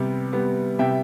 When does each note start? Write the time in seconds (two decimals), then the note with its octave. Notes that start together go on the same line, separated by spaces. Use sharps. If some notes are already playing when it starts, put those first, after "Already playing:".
Already playing: C3 G3 B3
0.33 G3 B3
0.79 C3 E5 G5